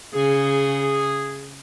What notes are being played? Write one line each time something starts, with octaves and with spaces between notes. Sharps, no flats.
C#3 G#4